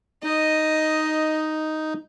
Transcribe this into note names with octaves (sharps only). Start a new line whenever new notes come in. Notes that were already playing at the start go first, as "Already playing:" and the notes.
D#4 D#5